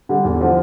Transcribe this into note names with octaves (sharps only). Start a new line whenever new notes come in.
D3 G3
E2
D3 F3